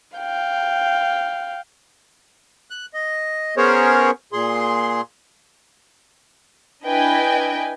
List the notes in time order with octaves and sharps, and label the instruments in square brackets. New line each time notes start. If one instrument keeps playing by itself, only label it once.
[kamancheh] F5 G5
[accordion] F#6
D#5
B3 C#4 G#4 A#4 C5 C#5
A#2 G#4 C6
[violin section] D4 E4 B4 D#5 G5 G#5